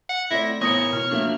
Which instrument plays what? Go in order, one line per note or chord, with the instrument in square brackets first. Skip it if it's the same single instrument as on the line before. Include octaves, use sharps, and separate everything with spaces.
[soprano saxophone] F#5
[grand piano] A3 C4 D5 [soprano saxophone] E4 [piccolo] A#6
[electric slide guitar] B3 E4 A#4 [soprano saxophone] C#5 [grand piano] D#6 C#7
[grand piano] B2 [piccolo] F6
[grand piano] F3 A#3 F#4 [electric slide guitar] D4 E5